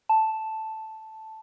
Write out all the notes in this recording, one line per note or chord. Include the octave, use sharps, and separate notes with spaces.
A5